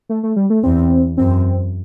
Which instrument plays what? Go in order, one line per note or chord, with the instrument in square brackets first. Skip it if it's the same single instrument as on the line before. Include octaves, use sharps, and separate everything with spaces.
[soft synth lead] A3
A3
G3
A3
[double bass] E2 [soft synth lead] C4
[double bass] F#2 [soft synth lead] C4